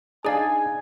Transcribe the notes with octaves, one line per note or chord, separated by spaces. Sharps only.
D4 D#4 G#4 D5 F5 G#5